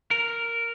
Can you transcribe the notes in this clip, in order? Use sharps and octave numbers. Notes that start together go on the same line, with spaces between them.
A#4